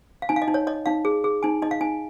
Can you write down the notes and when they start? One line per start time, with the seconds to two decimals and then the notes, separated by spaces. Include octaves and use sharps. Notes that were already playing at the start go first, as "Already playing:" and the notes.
0.22 F5
0.29 D#4 G#5
0.36 F5
0.42 D#5
0.48 D#4
0.54 C#5
0.67 C#5 D#5
0.86 D#4 F5
1.05 G#4
1.24 G#4
1.43 D#4 G#5
1.62 D#4 D#5
1.71 F5
1.81 D#4 G#5